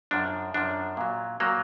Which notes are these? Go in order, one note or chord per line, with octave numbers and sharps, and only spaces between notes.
F#2 F3 D4
F#2 F3 D4
A#2 F#3
A#2 F#3 A#3